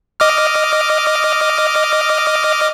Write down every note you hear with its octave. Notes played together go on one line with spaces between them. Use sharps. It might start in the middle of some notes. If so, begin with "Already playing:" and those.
D#5 D6 F6